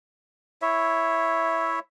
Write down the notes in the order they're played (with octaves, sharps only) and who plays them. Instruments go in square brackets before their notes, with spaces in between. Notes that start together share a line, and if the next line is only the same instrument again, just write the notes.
[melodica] E4 C#5 E5